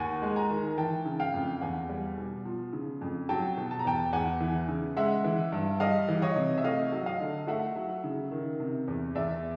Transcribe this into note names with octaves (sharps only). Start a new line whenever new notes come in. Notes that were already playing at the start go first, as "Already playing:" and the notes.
Already playing: D#2 F#5 G#5
G#3
G#5 A#5
D#3
E3 G5 A5
C#3
F5 G5
F2
E2 F#5 G#5
G3
B2
F3
C#3
F2
F#3 G5 A5
B2
A5
A#5
E2 G5 A5
E2 F#5 G#5
E3
C#3
G#3 E5 F#5
E3
G2
G3 D#5 F5
E3
C#5 D#5
C3
E5
A3 D#5 F5
F#3
D#5 F5
D3
A3 E5 F#5
F#3
C#3
D#3
C3
E2
E2 D5 E5